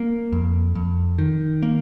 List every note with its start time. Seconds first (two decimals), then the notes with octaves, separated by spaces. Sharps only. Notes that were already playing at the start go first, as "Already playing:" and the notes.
Already playing: A#3
0.32 F2
0.75 F2
1.18 D#3
1.63 A#3